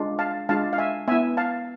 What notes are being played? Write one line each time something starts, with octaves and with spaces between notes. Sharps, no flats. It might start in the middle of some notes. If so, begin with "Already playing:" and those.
Already playing: G#3 D4 F4
F5 A5
G#3 D4 F4 F5 A5
F5
E5 G#5
B3 E4 E5 G#5
F5 A5